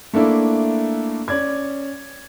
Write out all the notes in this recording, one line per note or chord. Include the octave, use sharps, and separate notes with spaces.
A3 A#3 D4 E4
C#4 D5 G#6